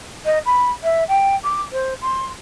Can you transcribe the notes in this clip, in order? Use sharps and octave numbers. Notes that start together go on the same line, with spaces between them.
D#5
B5
E5
G5
D6
C5
C6